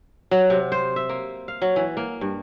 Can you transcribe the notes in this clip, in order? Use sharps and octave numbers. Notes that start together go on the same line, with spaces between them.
F#3
C3
C5
E5
A#3
F5
F#3
E3
A#3
G2